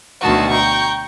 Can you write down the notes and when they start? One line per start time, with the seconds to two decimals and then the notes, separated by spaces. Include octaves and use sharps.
0.21 D2 B2 D#3 F#4 A5
0.51 G5 A#5 C#6